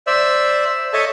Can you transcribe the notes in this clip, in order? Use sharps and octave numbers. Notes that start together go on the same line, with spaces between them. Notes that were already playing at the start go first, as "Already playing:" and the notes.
C5 D5 E5 E6
A4 C#5 D#5 E5 A5